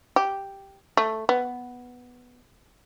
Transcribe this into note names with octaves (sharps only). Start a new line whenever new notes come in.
G4
A3
B3